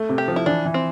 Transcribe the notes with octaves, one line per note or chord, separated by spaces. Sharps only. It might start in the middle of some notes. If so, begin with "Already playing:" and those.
Already playing: A3
C3
G4
F3
E4
E3 D4
E3
C4